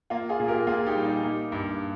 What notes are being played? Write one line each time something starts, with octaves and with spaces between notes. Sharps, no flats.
A#3 F4
F4 G#4
A#2
G4 A#4
A#2 F4 G#4
D#4 G4
G3
D#4
A#3
G2